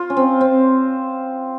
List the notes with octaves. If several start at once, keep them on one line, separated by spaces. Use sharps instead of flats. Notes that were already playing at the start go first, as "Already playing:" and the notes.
Already playing: F4
C#4
C4
C4